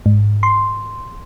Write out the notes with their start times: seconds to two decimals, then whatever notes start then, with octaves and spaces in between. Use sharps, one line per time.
0.06 G#2
0.43 C6